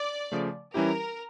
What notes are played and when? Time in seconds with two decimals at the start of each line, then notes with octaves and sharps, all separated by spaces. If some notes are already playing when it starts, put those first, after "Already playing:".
Already playing: D5
0.32 C#3 F3 A3
0.74 E3 G3 C#4 E4 G4 A#4